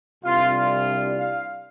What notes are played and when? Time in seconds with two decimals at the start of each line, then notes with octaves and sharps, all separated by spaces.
0.24 C2 C3 G3 D4 F4
0.56 F4
1.19 F5